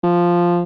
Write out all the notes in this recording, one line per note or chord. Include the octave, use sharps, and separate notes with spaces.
F3